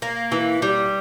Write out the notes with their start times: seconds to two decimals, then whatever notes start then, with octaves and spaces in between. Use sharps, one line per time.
0.02 A#3
0.32 E3
0.62 G3